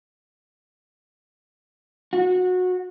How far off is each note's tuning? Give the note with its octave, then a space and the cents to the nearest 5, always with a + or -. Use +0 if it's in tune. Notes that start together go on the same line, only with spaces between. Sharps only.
F#4 -20